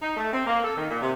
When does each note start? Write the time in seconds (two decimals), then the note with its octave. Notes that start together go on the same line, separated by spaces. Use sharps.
0.02 D#4
0.17 A3
0.33 C4
0.46 A#3
0.64 A4
0.76 D#3
0.90 A#2
1.02 C3